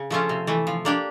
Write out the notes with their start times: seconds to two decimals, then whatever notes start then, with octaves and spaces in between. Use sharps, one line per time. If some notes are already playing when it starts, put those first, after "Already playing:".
Already playing: C#3
0.10 F3 A3 C#4 F4
0.29 C3
0.47 E3 A3
0.67 F3
0.85 A#3 D4 G4